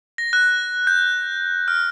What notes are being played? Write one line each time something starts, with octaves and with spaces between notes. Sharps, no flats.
A#6
F#6
G6
F6